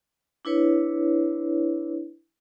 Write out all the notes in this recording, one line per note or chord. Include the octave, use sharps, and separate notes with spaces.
D4 E4 B4 C#5